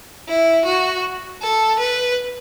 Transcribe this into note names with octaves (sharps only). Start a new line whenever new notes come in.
E4
F#4
A4
B4